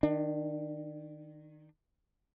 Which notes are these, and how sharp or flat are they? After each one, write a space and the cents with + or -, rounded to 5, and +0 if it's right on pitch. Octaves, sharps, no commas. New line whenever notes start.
D#3 -5 D4 +25